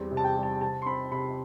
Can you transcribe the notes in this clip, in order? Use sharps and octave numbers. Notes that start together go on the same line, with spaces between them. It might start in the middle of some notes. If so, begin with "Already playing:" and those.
Already playing: E2 G3 C4
C3
A5
G5
G3
A5
C3 A5
C6
C4 B5
C3 B5